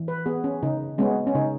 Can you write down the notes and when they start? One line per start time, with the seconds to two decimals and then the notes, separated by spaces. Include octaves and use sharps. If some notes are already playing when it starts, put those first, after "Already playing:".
Already playing: E3
0.08 B4
0.26 B3 G#4
0.44 C#4
0.63 C#3 D#4
0.98 G#3 B3 C#4
1.27 C#4
1.35 C#3 D#4